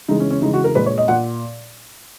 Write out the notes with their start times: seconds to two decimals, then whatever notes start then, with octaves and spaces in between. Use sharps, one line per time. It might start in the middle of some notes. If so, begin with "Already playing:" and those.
0.08 C#3 E3 G#3 D#4
0.20 C#4
0.30 C#4
0.42 C#3 E3 G#3 D#4
0.54 F#4
0.64 A#4
0.75 A#2 G#3 B4
0.86 C#5
0.98 D#5
1.08 A#2 F#5